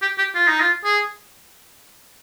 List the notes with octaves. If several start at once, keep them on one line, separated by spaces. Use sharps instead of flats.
G4
G4
F4
D#4
F4
G#4